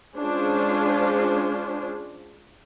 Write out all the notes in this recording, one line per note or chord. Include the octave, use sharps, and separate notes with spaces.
G#3 C#4 D4 F4 G#4 C5